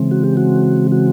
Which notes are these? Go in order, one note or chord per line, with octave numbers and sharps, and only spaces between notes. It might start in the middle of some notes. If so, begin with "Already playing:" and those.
Already playing: C#3 E3 G#3 C4
F#4
G4
F#4
F#4